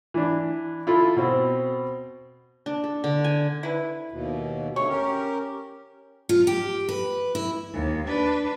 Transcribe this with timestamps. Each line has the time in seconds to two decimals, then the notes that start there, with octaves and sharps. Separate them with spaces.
0.14 E3 D4
0.87 E4 F4 A4
1.17 B2 C4
2.66 D4
2.84 A4
3.04 D3
3.24 G#5
3.63 E4 B4
4.12 D#2 B2
4.76 D3 A3 C#5 C#6
4.88 C#4 G4 A#4
6.29 F4
6.47 G4
6.89 B4
7.35 E4
7.73 D#2
8.07 D4 B4